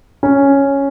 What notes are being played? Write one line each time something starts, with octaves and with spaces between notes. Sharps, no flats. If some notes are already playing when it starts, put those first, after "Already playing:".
C#4